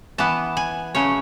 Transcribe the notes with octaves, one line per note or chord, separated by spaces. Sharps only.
E3 B3 A5
G#5
C#3 F#3 A3 C#4 C#5